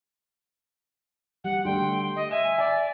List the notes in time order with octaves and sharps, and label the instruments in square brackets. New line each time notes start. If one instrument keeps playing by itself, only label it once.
[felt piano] G3 [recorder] F#5
[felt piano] D3 G3 A3 [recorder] G5 [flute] C6
[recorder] D#5
[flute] E5 [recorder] G#5 [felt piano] E7
[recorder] D5 [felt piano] G#5